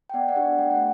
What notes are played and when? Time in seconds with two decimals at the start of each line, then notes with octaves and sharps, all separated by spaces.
0.10 G5
0.14 B3 D5 F#5
0.28 D5 F#5
0.36 D4 G4
0.59 A3 G5
0.70 F#5